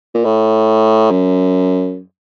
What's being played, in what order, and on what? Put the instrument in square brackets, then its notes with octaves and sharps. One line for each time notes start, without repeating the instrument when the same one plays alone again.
[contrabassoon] A#2
A2
F#2